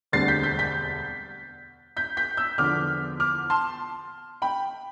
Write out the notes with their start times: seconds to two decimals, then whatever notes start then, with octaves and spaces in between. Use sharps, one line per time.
0.12 E1 D2 D3 G3 C4 A6 C7
0.28 G6 B6
0.43 G6 B6
0.59 G6 B6
1.97 G6 B6
2.17 G6 B6
2.37 E6 G6
2.58 E2 D3 F3 B3 D6 F6
3.20 D6 F6
3.50 A5 C6
4.42 G5 B5